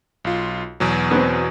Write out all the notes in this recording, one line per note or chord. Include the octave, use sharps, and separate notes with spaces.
B1 F4
E2 B2 F#3
B3 C4